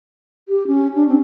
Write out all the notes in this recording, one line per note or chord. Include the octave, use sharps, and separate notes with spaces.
G4
C#4
D4
C4